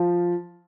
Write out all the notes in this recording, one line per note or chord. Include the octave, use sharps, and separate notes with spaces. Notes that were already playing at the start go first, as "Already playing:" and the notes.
Already playing: F3